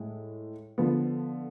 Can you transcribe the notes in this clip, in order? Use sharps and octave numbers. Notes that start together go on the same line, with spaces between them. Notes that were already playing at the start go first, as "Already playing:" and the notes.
Already playing: A2 G#3
D3 F3 B3